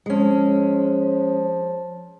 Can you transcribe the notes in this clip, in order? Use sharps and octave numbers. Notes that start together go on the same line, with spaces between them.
F3 G#3 C#4